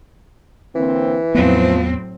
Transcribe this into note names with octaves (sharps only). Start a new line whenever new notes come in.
D3 E3 A#3 C4
E2 A2 F3 F#3 B3 C4